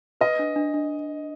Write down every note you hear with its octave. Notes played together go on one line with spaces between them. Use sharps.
B4 D#5
D4
D4
D4